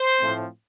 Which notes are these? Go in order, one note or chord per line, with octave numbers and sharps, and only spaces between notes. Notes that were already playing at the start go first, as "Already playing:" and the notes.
Already playing: C5
A2 F3 A3 C4